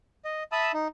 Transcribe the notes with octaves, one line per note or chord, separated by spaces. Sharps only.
D#5
E5 A5 B5 D#6 E6
D#4